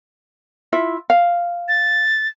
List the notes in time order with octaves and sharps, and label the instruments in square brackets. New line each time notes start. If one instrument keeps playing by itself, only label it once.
[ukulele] E4 F4 E5
F5
[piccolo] A6